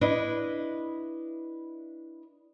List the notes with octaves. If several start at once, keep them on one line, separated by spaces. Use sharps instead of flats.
D4 E4 B4 D#5